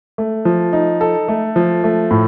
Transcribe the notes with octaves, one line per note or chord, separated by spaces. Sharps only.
A3
F3
D#4
A4
A3
F3
A3
A2